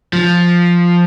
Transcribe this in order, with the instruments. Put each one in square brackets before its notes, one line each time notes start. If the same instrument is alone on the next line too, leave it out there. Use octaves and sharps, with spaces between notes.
[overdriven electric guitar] F3